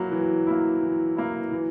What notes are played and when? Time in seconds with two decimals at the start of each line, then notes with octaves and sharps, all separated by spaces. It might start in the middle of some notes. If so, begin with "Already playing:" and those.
Already playing: F#3 A#3 E4
0.12 E3
0.47 A#3 E4
0.81 E3
1.16 A#3 E4
1.51 E3